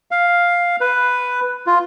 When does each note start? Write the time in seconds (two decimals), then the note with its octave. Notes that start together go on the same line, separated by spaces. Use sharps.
0.11 F5
0.81 B4
1.67 F4